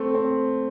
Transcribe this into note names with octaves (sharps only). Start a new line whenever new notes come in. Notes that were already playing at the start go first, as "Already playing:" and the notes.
Already playing: A3 C4
C4